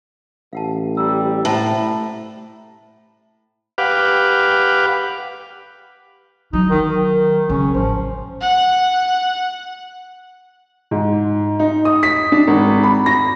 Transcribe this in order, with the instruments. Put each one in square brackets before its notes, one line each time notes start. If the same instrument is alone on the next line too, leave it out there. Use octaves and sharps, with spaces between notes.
[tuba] A1 [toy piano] F5 F#5 A5
[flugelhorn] G3 [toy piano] A#5 E6
[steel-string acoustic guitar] A2 [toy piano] C5 F#5 A#5 [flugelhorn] A5
[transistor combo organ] G4 B4 F5 F#5 D6
[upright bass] F#3 [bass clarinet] D#4
[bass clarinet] D#3
D#3
[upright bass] C#3 F#3 [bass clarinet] C#4
[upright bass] A1 [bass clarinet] F3
[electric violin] F#5
[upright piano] G#2
D#4
D#6
B6
D4
G#1
B5
A#6